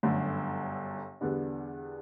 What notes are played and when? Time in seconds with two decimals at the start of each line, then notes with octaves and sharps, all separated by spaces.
0.03 G1 F#2 D3 A3
1.21 E2 D3 G3 B3 D4